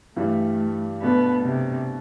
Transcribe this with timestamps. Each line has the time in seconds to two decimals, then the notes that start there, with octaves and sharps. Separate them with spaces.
0.16 G2 E3 G3 A3
1.02 B2 A3 B3 D4
1.45 C3